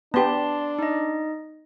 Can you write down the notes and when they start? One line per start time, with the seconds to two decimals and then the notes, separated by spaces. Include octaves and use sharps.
0.14 B3 D4 G4 A5 C6
0.79 D#4 D#5